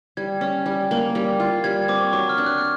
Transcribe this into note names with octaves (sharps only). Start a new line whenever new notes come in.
G3 G#6
C#4
G3
A#3
G3
F4
G3 G#6
C4 D6
C#6
F#3 C#6
F6
D4
F#6